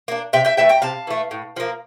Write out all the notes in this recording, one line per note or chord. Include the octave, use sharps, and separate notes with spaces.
A#3 D4
C3 E5 G5
E5 G5
E3 A3 E5 G5
G5 A#5
C3 F5 A5
E3 A3
A2
F3 A#3